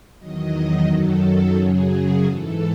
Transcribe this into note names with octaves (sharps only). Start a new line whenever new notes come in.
E2 D#3 F#3 D#5
F#2 D#3 F#3 A4
F#2 C#3 F#3 G#4
G#2 E3 A4